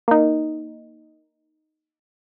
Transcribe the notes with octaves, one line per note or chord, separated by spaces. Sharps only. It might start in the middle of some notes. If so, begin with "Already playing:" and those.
A#3 D#4